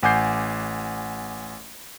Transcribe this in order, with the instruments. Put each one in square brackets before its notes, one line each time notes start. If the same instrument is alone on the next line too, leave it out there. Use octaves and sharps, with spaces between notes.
[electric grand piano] A1 F#5 G#5 D6 G6 C7